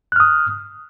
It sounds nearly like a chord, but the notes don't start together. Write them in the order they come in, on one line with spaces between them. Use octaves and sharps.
F#6 F6 D#6